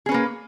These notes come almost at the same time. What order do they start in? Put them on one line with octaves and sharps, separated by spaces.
G#4 C#4 B4 A#3